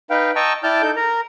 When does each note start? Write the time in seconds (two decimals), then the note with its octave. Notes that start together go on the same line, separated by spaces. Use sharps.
0.10 D#4 B4 F5 G5
0.36 D#5 G5 A5 A#5 C#6 E6
0.63 E4 D5 G5 A5 F6 G6
0.82 D#4 A4 G6
0.96 A#4 A#5